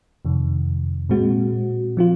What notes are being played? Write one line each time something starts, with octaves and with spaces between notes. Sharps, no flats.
F2 C3 D#3
A#2 G#3 C4 F#4
F3 C4 F4